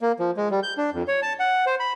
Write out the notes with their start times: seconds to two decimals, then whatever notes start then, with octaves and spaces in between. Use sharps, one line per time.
0.01 A#3
0.19 F3
0.37 G#3
0.51 G3
0.63 G6
0.78 D4
0.93 F2
1.08 C#5
1.22 A5
1.40 F#5
1.66 C5
1.80 B5